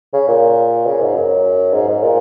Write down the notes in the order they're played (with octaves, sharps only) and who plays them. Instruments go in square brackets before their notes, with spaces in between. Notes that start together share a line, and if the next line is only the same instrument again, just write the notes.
[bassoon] C#3
A#2
C#3
G#2
F#2
G#2
G#2
A#2